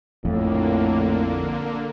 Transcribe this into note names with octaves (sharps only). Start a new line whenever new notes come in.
A#1 F2 A2 D3 A#3